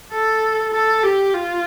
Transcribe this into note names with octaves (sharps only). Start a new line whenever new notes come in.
A4
A4
G4
F4